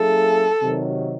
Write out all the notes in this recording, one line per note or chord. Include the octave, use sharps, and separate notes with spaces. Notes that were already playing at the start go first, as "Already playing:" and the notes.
Already playing: F#3 A#3 C#4 E4 G#4 A4
C3 D#3 F#3